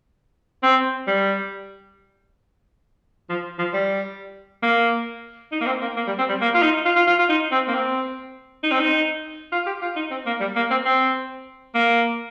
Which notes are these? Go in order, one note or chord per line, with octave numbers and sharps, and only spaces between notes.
C4
G3
F3
F3
G3
A#3
D#4
A#3
C4
A#3
A#3
G3
C4
G3
A#3
F4
D#4
F4
F4
F4
F4
D#4
C4
A#3
C4
D#4
C4
D#4
F4
G4
F4
D#4
C4
A#3
G3
A#3
C4
C4
A#3